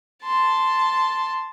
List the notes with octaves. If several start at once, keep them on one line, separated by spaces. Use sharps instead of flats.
A5 C6